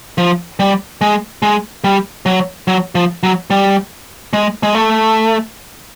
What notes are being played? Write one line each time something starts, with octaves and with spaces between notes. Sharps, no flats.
F3
G3
G#3
G#3
G3
F#3
F#3
F3
F#3
G3
G#3
G#3
A3